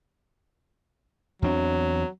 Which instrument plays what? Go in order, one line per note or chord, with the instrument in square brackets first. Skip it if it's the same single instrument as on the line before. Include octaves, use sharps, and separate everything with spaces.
[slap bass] E2 C4 D4 [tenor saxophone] F#3